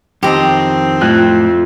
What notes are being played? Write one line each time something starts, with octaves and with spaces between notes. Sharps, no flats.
F2 D#3 C4 G4 D#5 A5
F2 A2 F#6